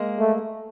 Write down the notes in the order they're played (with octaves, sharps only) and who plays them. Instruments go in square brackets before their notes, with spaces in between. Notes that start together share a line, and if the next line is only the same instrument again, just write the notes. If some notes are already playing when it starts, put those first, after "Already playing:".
Already playing: [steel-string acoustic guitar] G#3 A#3
[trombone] A3